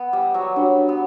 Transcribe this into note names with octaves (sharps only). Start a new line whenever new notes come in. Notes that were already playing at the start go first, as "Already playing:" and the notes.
Already playing: B3
G3
F#3
G3 D4 F#4 C#5
B3